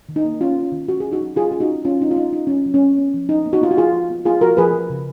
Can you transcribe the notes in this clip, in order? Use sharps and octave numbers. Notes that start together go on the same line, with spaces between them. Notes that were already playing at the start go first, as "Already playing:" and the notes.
D#3
D#4
A#3
D#3 C#4 F4
C#4
D#3
C#4 F#4
C#4 G#4
D#4 F#4
F#3
F#3 F4 G#4
C#4 G#4
D#4 F#4
C#4
F#3 C#4 F4
F#3 D#4
F4
C#4 D#4
C#4 D#4
F#3 C#4
F#3
C#4
B3
B3
F3
F3 D#4
B3
D#4 F#4
B3 F4
F#4
F3 F4 G#4
F3
B3
B3 F4 G#4
F3 F#4 A#4
F3 G#4 B4
F3
C#3